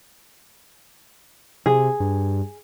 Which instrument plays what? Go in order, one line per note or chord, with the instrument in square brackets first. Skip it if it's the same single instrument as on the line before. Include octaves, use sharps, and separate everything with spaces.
[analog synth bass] C3 [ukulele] G#4
[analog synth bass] G2